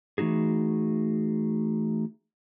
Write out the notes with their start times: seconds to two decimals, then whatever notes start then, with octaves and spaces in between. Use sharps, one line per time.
0.18 E3 A3 D#4 F#4 G#4